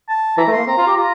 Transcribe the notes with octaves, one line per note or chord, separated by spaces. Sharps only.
A5
E3 A#5
A3
A#3 C6
C4 A#5
F4
G4
F4 A#5